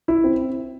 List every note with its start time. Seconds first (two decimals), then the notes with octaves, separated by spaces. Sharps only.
0.08 E4
0.24 C4